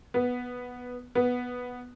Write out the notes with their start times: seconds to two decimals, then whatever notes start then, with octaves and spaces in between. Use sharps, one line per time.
0.14 B3
1.15 B3